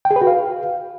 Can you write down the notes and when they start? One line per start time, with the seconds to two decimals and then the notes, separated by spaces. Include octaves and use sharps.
0.05 G5
0.11 G#4
0.16 B4
0.22 F#4
0.27 F5